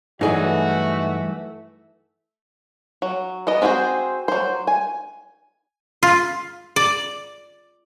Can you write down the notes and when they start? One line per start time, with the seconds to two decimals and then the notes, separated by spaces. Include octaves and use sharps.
0.21 G2 E3 F#3 A3 D#4 F#4 G#4 B4
3.02 F#3
3.47 B3 E4 D#5
3.62 C4 D4 F#4 G#4 C5
4.28 F#3 C5
4.67 G#5
6.03 F4
6.76 D5